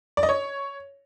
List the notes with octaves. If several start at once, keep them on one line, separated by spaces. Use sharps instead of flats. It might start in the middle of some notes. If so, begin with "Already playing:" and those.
D5
D#5
C#5